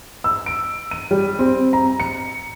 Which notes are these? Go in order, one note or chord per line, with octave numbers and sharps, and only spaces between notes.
E6
D7
D#7
G3
C4
A#5
C#7